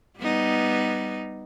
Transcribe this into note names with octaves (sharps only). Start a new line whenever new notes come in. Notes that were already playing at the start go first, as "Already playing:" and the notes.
G3 B3 D#4